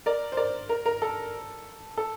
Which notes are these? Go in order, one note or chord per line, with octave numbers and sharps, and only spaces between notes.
A#4 D5
C5
A#4 D5
A#4
A#4
A4
A4